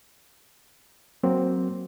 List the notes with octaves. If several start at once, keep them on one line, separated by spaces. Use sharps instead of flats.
F#3 A#3 C4 F#4